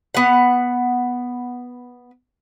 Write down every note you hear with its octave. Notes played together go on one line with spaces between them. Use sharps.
B3 F#5